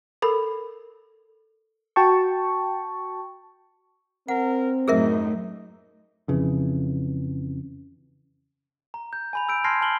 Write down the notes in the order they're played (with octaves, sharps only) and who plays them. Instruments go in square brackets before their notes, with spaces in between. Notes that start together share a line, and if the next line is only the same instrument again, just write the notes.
[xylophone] A4 A#4 B5
[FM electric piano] F#4 G5 A5 C#6
[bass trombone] C4 [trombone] A#4 [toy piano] F#5
[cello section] F#2 A2 [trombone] D#4 [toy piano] G#4 A#4 E5
[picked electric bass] F2 C#3 E3
[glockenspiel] A#5
G6
G#5 B5 F7
E6 G6 D7
A5 C6 F6 G#6 A#6 C7
A5 F6 F#7 G7